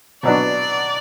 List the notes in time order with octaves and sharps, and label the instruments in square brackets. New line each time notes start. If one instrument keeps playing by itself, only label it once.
[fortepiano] B2 F#3 B3 D4 [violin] D5